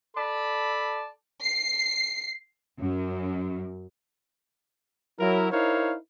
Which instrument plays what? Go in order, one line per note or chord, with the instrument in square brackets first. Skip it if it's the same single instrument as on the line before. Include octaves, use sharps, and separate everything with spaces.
[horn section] A4 D5 A5 B5
[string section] C7
F#2
[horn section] F#3 E4 A#4
D#4 E4 A#4 C5 C#5 F5